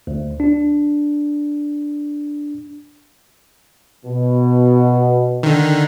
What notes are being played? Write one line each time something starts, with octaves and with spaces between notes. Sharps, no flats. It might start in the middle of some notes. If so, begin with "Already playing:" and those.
D2
D4
B2
D3 D#3